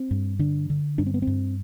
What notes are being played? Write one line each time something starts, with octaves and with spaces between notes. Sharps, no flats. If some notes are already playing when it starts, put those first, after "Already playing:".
Already playing: C4
G2
D3 D4
D3
G2 D4
C4
B3
C4
G2